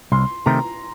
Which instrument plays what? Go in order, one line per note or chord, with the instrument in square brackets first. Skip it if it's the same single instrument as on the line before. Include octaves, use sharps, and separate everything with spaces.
[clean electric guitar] C2 [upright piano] C6
[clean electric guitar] C3 D#3 A3 C4 [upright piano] A#5